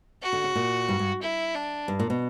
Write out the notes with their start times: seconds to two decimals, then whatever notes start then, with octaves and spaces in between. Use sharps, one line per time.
0.22 F#4
0.33 D3
0.44 C#3
0.55 A#2
0.89 G2
0.99 G2
1.22 E4
1.54 D4
1.88 G2
2.00 A#2
2.10 B2